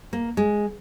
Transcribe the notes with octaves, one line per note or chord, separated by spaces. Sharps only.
A#3
G#3